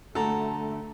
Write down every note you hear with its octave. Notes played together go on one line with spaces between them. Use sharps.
D3 A3 F#4 A4 A#5